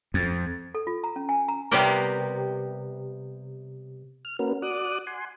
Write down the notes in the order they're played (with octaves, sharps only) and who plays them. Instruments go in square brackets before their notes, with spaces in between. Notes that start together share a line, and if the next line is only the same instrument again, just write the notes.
[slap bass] F2
[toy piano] A4
F4
A#5
C#4
G#5
A#5
[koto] C3 G3 B3 G4 A#4
[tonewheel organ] F6
A#3 C#4 F#4 A#4 B4
F#4 D5 D6 D#6 F#6
F#5 G#5 C6